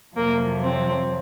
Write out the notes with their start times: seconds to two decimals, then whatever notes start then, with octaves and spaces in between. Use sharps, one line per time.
0.15 F2 C3 F#3 A#3
0.63 C4